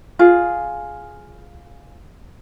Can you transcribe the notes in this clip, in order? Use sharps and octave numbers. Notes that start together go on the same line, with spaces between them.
F4 G#4